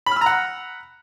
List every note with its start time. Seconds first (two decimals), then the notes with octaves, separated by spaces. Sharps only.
0.06 B5
0.11 F6
0.16 E6
0.21 A#5
0.26 F#5